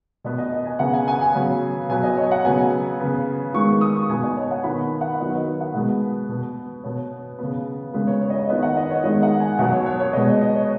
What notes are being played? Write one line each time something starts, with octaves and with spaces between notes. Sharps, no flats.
B2 B3 D#5
D#5
D#5
G#5
C#3 B3 F#5
G#5
G#5
G#5
C#3 F#3 B3
B2 F#3 B3 G#5
D#5
C#5
F#5
C#3 F#3 B3 G#5
C#3 B3
D#3 G#3 B3 C#6
C#6
D#6
C#6
B2 B3 G#5
D#5
C#5
F#5
D#3 B3 B5
F#5
D#3 F#3 B3 D#5
B4
F#5
B2 G#3 B3 B4
B2 B3
B2 B3 C#5
C#3 B3
C#3 G#3 B3 B4
C#5
C#5
D#5
C#5
D#3 B3 D#5
F#5
D#5
C#5
D#3 G#3 B3 D#5
F#5
G#5
B2 F#3 B3 F#5
C#5
C#5
C#5
B2 G#3 B3 D#5
D#5
D#5
C#5